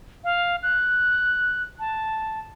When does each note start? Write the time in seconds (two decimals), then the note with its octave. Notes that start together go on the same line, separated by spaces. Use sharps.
0.24 F5
0.63 F#6
1.79 A5